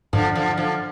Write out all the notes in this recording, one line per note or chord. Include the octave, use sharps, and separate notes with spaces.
G#2 D3 F3
D3 F3
D3 F3